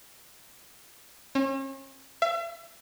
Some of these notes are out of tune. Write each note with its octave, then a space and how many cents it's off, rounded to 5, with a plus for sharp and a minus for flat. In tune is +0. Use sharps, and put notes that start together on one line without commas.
C#4 -40
E5 +45